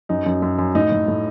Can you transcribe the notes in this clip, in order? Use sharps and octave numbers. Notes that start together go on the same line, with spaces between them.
F#2 D#4
F#2
F#2
F#2
A2 D#4
A2
A2